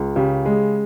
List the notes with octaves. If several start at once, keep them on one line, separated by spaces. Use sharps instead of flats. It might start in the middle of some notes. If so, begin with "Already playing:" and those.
Already playing: C#2
C#3 G4
G#3